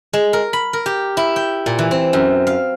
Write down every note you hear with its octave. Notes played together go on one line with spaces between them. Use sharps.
G#3
A#4
B5
A#4
G4
E4
G5
A#2
E3
C4
F#2
F5